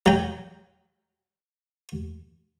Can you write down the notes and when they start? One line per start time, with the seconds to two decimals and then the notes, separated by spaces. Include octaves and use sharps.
0.06 F#3 G5